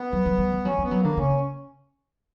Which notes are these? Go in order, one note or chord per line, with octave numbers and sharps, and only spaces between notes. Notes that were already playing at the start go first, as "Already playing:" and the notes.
Already playing: B3
F#3
F#3
G3
G3
F#3 C#4
G3 B3
F#3
D3 A#3
C#3 C#4